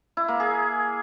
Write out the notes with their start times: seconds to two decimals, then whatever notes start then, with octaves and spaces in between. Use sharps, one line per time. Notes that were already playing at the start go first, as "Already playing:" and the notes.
0.17 E4
0.28 A#3
0.40 G#4